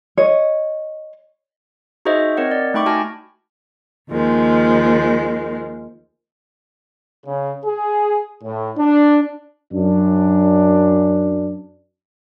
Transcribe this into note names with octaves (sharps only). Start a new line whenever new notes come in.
C#5 D#5
D#4 F#4 G#4 C5 D#5 E5
C4 A#4 C#5 D#5 F#5
D5
A3 D#4 G5 B5 C#6 D6
F#4 G#5 A5 F6 A#6
D#2 D#3 F3 G#3
C#3
G#4
A2
D4
F#2 D4